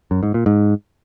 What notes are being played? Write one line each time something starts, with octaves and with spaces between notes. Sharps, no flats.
F#2
G#2
A#2
G#2